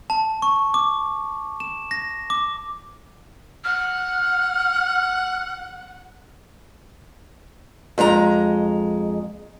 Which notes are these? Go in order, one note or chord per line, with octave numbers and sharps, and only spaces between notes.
A5
C#6
D6
E7
A#6
D6
F#5 F6
F2 G#3 F4 A#5